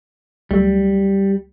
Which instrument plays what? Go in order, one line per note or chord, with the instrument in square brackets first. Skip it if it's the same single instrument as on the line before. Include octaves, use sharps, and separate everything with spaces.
[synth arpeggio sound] C#2 F#3 A3 [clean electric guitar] G3